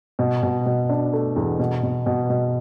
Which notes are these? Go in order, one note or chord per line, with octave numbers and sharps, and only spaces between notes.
B2
B2
B2
D4
A3
E2
B2
B2
B2
B2